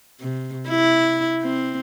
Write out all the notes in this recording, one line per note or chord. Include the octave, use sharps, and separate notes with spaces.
C3
E4
C4